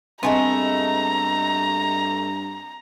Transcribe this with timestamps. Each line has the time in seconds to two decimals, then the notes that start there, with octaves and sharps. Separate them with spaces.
0.23 G2 G#3 A3 B3 C4 G#5 A#5